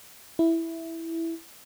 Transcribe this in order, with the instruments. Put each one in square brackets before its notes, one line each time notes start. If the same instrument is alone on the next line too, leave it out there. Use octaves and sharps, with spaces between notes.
[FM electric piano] E4